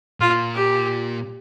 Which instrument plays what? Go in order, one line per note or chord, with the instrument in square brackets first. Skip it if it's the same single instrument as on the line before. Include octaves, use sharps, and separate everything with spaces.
[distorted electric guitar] A#2 [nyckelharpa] F4
[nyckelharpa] G4